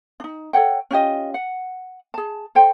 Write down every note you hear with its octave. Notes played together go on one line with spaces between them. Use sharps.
D4 D#4
A4 C#5 F#5 G5
C#4 F4 G4 D#5
F#5
G#4 A5
A4 C5 G5